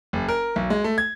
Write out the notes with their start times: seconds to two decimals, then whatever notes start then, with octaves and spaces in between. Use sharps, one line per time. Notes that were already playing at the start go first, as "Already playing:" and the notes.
0.13 F#1
0.29 A#4
0.56 B1
0.70 G#3
0.84 A3
0.98 G#6